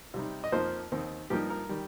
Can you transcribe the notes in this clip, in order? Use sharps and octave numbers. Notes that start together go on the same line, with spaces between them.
C3 G3 D#4
D#5
F2 F3 A#3 D#4 C5
D#2 D#3 C4 D#4
G2 F3 A#3 D#4 G4
A#4
D#3 G3